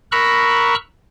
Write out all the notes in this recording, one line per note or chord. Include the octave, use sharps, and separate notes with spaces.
A#4 A#5 B5 C#6 E6 F#6